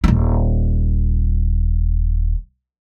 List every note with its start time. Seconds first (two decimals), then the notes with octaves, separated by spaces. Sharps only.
0.04 D#1 D#4